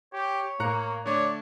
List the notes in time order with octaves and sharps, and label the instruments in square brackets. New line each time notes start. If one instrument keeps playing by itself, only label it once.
[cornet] G4 [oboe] C#5
[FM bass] A2 [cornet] A#3 [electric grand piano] A#5 F#6 C#7
[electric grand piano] D3 A3 [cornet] C#5 [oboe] D5